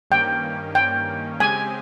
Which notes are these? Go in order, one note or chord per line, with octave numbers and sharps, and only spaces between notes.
G2 D#3 A#3 C#4 G5
G5
C#3 G#3 C4 G4 G#5